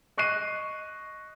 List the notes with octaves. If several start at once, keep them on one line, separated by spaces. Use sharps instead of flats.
D#5 C#6 F#6 C7 D#7